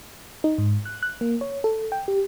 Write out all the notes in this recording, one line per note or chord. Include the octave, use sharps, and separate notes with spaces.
D#4
G#2
F#6
F#6
A#3
C#5
A4
G5
G4